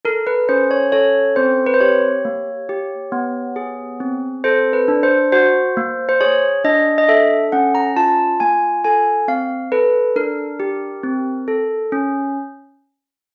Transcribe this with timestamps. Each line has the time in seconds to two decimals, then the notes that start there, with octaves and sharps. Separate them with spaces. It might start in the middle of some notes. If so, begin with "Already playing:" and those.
0.05 A4 A#4
0.27 B4
0.49 C#4 C5
0.71 C#5
0.92 A4 C#5
1.36 C4 C5
1.67 B4
1.74 C5
1.80 G4 C#5
2.25 A#3
2.69 G4
3.12 B3
3.56 G#4
4.00 C4
4.44 A4 C5
4.73 B4
4.88 D4
5.03 C5
5.32 F#4 C5
5.77 A#3
6.09 C5
6.21 G#4 C#5
6.64 D4 D#5
6.98 D#5
7.08 A4 E5
7.52 C#4 F#5
7.75 A#5
7.96 F4 A5
8.40 A#3 G#5
8.84 A4 G#5
9.28 C4 F5
9.72 A4 B4
10.16 D4 A#4
10.60 G4
11.04 C4
11.48 A4
11.92 C#4